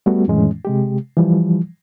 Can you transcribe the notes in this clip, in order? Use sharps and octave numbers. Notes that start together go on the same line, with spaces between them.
G3 A3 B3 F#4
F2 A2 D#3 E3 G#3 C#4
C3 G#3 G4
E3 F3 G3